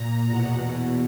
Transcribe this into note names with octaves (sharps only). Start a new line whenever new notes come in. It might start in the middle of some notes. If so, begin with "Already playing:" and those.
Already playing: A#2 A#5
E2 B2 F#5